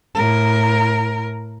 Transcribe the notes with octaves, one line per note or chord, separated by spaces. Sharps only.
A2 A#4